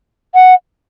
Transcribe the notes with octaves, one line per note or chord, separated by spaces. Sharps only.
F#5